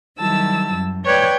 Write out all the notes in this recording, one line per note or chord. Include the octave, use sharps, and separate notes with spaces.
D#3 F#3 G3 E4 A5 E6
F#2
B4 C#5 D5 G5 F#6 G#6